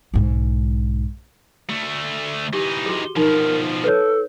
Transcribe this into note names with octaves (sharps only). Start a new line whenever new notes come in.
B1 G#2
D2 A3
E3 D#4 G4
F#4 G#4
B2 F3 D#4 A#4
A4 B4 C#5